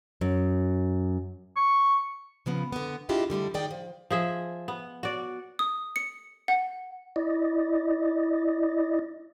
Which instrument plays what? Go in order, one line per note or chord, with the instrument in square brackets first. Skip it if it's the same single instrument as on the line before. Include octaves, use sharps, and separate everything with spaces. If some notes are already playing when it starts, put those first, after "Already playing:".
[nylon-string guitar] F#2
[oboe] C#6
[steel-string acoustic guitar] C#3 F3 B3
D3 B3
D4 E4 F4 G4 G#4 D#5
D3 G3 A3 E4
D#3 D#4 G#4 D5 G5
F3
[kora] F3 G#4 E5
B3
F#4 D5
[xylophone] D#6
C#7
F#5
[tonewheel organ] E4 D5 D#5